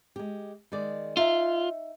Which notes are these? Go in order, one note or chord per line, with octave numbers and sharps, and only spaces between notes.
G#3 G4
D#3 G#3 D5
D#4 F4 E5